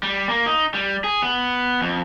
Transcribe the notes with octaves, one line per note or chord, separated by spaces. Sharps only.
G3
A#3
D#4
G3
G#4
B3
F2